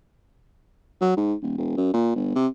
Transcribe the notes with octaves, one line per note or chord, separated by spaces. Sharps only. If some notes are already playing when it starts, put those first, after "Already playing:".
F#3
G#2
D#1
E1
F#2
A#2
G1
C3